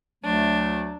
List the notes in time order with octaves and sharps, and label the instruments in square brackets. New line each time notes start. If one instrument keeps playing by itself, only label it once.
[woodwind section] D2 F#3 A3 [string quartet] D4